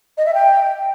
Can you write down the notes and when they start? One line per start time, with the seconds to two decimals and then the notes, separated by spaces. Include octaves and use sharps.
0.17 D#5
0.26 E5
0.34 G5